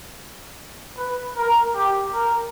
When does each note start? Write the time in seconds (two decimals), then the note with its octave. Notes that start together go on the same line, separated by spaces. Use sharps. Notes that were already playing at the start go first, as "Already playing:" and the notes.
0.98 B4
1.37 A#4
1.75 G4
2.14 A#4